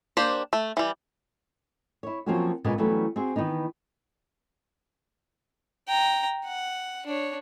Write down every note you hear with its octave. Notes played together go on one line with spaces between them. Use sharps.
A#3 D4 G4 C5
A3
E3 G3
E4 C#5
F3 F#3 A#3 C4 C#4 F#4
A#2 C#3 G#3 A#3 B3
E3 F#3 G3 A3 B3 C#4
C4 F#4 G#4
D#3 E3 B3 D#4
G5 A#5
F#5
D4 C#5